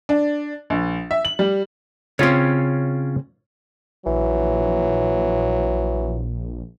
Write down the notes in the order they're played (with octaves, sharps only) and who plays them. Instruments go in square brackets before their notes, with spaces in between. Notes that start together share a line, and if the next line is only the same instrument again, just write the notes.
[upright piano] D4
A#1
E5
F#7
G3
[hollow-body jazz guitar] C#3 C4 [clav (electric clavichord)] C#4 F4 C#5
[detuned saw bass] A#1 [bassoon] E3 [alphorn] F#3